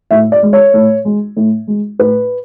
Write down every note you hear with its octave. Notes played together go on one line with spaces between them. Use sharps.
A2 E5
D5
G#3
C#5
A2
G#3
A2
G#3
A2 B4